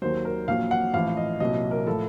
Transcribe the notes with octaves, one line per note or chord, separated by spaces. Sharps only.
D#2 D#3 F#3 C5
A#4
A#1 A#2 F#3 F5
F#5
A1 A2 F3 F5
D#5
C2 A#2 F#3 D#5
A#4
A2 F3 A4